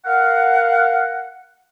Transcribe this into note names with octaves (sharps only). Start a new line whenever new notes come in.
A#4 F5 F#5